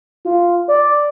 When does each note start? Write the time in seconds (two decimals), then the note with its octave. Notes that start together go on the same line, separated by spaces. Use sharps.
0.25 F4
0.68 D5